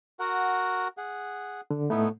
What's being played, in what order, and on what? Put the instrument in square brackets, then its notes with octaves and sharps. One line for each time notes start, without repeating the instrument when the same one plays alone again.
[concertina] F#4 A#4 F#5
G#4 F#5
[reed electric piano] D3
[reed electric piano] A2 A3 [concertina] B3 D#4 E4